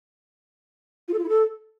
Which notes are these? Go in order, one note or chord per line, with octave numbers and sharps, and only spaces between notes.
F4
A4
F4
E4
A4